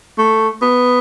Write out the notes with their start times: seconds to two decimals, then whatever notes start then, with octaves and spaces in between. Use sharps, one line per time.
0.18 A3
0.62 B3